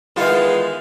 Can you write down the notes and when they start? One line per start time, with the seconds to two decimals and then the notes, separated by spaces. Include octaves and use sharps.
0.16 D#3 E3 G#3 B3 D#4 F4